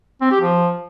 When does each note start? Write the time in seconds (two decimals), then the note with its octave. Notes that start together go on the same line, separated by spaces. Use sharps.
0.21 C4
0.31 G4
0.41 F3